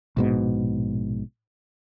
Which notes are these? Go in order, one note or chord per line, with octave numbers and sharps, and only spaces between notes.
A#1 G#2 B2